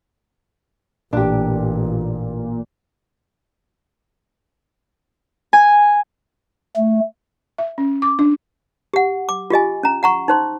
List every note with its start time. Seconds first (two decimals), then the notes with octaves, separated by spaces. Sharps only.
1.13 A1 A#2 D4 G4
5.53 G#5
6.77 A3
7.58 E5
7.78 C#4
8.02 D6
8.19 D4
8.94 G4 F#5
9.29 D6
9.50 F4 G4 D#5 G#5
9.83 C#4 A#5
10.03 F#5 A#5 C#6
10.28 D#4 C5 C6